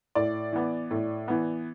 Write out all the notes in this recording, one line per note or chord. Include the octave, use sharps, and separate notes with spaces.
A2 D5
E3 B3
A2
E3 B3